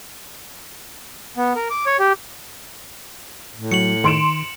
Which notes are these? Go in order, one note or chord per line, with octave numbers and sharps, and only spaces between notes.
B3
A#4
D6
C#5
G4
A2
F#3 C#7 F#7
D#3 C6 D7 E7